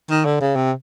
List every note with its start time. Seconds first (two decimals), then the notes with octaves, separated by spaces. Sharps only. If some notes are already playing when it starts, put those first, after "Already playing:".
0.10 D#3
0.25 D3
0.41 C#3
0.56 C3